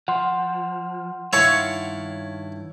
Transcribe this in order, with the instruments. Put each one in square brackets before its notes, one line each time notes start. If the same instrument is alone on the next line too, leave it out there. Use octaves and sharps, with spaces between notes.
[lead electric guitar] F3 [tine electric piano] F#5 C6
[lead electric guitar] G2 D#3 [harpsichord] E4 A5 [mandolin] C#5 F5 C#6